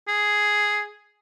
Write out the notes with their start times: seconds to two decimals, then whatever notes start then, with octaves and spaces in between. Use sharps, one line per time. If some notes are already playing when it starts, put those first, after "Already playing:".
0.08 G#4